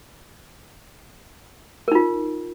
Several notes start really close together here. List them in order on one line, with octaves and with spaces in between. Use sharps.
A#4 D#4 F4